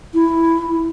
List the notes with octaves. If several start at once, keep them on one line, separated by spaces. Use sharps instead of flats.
E4